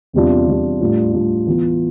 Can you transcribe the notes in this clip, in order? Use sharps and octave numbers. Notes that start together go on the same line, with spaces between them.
E2 C3 G3 D4 F4
E2 C3 G3 D4 F4
A2 G3 D4 F4
A2 G3 D4 F4
E3 B3 F4